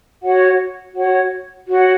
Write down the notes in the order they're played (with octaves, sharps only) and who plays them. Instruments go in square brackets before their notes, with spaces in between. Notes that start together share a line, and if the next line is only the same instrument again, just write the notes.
[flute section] F#4 C#5 F#5
F#4 C#5 F#5
F#4 C#5 F#5